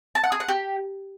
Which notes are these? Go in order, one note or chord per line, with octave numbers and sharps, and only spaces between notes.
A5
F#5
G#4
F#5
G4